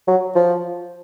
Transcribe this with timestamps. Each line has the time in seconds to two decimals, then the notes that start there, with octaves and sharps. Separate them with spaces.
0.08 F#3
0.35 F3